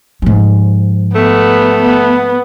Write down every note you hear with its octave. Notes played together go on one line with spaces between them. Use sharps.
G#2 F3
A3 B3
B3